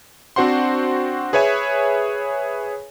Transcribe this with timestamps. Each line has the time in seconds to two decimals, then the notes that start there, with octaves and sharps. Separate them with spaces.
0.36 C4 D4 F#4 C5 F#5 C6
1.33 G#4 B4 C#5 E5 G#5